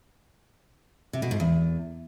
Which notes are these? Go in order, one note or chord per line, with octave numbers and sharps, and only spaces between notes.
C3
B2
G#2
E2